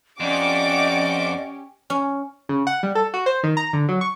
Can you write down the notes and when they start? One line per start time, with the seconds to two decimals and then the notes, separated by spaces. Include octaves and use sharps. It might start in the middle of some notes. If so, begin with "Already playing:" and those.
0.20 F2 C#4 G4 D5 D#5 F#5 D6
1.90 C#4
2.49 C#3
2.67 F#5
2.83 G3
2.95 A4
3.14 F#4
3.26 C5
3.43 D#3
3.57 A#5
3.73 D3
3.89 F#3
4.01 C#6